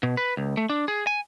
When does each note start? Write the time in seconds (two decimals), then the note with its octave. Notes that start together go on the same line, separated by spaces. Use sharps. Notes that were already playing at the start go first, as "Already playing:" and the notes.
0.03 B2
0.17 B4
0.37 C#2
0.57 A3
0.70 D4
0.88 G#4
1.07 G#5